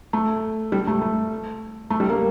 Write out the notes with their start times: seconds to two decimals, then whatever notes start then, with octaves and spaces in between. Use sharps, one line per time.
0.13 A3
0.72 G3
0.87 A3
1.01 A3
1.90 A3
2.00 G3
2.09 A#3